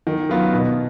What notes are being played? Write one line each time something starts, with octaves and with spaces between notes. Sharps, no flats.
D#3
F#3 B3 F4
B2